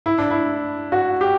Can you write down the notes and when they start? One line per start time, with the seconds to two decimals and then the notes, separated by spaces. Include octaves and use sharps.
0.06 E4
0.18 D4
0.30 E4
0.92 F#4
1.21 G4